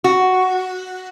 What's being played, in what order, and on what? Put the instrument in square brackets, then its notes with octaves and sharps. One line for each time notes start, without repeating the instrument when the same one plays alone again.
[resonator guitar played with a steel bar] F#4